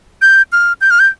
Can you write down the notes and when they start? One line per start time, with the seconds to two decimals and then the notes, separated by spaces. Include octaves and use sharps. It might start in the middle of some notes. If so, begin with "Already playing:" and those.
0.22 G6
0.52 F6
0.81 G6
0.90 F6
0.99 G6